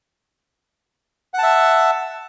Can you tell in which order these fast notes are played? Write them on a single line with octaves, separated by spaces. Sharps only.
F#5 A5 E5